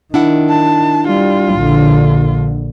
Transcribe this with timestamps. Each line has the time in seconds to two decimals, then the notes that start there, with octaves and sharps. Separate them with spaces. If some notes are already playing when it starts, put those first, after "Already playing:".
0.14 D#3 D4 E4 F#5
0.50 A5
1.08 G3 F4
1.56 A#1 D3